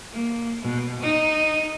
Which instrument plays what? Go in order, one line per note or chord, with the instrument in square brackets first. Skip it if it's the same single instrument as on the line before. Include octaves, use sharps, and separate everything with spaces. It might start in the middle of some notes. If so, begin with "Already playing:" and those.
[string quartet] A#3
B2
D#4